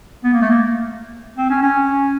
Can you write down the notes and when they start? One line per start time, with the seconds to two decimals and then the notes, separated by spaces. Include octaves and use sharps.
0.24 B3
0.33 A#3
0.42 A3
0.50 A#3
1.38 C4
1.50 C#4
1.63 C#4